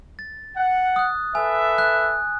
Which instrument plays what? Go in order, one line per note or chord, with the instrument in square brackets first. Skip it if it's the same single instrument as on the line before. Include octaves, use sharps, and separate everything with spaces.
[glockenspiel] A6
[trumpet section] F#5
[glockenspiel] D#6 F#6
[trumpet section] A4 B4 E5 [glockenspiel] G#5
[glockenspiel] F#6